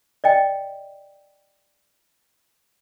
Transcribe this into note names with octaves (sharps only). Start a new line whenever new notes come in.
D5 D#5 G5